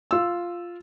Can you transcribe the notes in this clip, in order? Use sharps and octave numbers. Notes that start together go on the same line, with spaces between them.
F4 E6